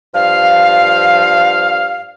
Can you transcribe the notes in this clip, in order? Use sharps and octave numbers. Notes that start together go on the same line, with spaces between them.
G2 F3 F5